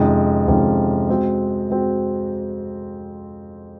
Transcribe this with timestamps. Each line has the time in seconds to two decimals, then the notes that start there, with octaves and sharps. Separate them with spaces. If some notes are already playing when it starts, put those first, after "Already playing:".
Already playing: F2 C3 D#3 G#3 C#4
0.48 F2 C3 D#3 G#3 C#4
1.08 G#3 C4 F#4
1.70 G#3 C4 F#4